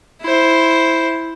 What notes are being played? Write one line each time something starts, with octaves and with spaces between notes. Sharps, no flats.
E4 C5